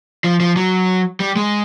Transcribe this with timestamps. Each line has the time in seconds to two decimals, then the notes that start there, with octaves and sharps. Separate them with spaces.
0.24 F3
0.40 F3
0.56 F#3
1.20 G3
1.36 G#3